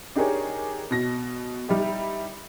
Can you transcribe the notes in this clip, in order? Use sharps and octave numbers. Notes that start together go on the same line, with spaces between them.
D4 D#4 G4 G#4 A#4 C#5
B2 A#6
G3 D#4 E4 G4